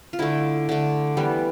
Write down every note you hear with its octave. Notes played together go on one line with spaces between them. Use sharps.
F4
D3 A3 E4
D3 A3
E3 G3 B3